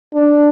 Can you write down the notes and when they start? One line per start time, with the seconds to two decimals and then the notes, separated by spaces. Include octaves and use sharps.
0.14 D4